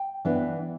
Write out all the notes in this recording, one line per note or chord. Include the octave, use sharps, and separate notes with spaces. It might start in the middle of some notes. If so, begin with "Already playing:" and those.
Already playing: G5
E3 B3 D4